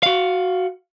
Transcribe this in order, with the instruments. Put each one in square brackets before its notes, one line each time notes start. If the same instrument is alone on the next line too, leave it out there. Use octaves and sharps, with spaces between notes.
[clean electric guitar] F#4 F5